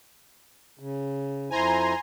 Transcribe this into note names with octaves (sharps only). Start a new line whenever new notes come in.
C#3
F2 E4 C5 G#5 A#5 C6